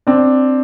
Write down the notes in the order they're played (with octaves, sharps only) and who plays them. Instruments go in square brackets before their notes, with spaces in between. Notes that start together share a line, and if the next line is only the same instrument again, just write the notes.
[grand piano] C4 D4